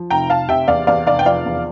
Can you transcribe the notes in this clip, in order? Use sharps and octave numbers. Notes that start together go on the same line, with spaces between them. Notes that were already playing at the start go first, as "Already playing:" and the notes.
Already playing: F3
F1 G5 A#5
F1 F5 A5
C3 E5 G5
E2 D5 F5
E2 D5 F5
F1 D5 F5
G5
F3 D5 F5
E2